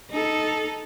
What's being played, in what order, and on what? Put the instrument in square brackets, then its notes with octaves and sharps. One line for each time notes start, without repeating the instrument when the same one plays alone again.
[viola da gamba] D#4 A4